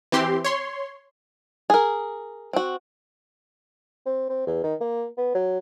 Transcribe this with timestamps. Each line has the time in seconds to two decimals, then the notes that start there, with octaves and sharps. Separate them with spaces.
0.12 E3 C4 G4 C6
0.44 C#5 C6
1.70 G#4 A#4
2.53 C4 F#4
4.06 C4
4.29 C4
4.47 E2
4.63 D#3
4.81 A#3
5.17 B3
5.34 F#3